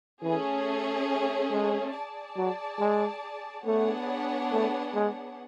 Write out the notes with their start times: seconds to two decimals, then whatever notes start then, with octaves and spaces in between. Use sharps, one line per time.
0.22 E3 A3 C#4 G#4
1.51 G#3
1.94 G#4 D5 A5
2.37 F#3
2.80 G#3
3.66 A3 B3 D4 G#4 C#5 F#5
4.52 A3
4.95 G#3